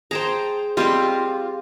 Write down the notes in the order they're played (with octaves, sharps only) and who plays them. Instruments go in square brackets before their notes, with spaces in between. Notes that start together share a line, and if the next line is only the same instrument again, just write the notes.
[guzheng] G#4 C5 [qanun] G5 A5 A#5
[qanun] G3 C4 G4 [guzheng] F4